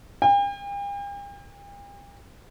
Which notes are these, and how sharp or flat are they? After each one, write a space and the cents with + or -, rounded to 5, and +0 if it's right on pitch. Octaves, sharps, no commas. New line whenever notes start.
G5 +45